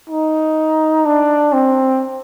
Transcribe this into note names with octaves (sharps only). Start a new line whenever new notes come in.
D#4
D4
C4